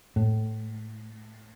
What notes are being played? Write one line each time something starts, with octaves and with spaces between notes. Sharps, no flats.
A2